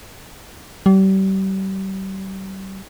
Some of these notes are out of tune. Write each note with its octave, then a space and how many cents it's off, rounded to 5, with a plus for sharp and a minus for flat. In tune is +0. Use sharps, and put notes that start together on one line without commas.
G3 -35